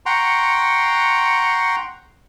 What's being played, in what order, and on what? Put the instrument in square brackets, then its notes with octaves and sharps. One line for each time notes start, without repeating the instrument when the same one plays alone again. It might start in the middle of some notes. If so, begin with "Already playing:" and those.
[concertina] F#5 G5 A#5 C6 C#6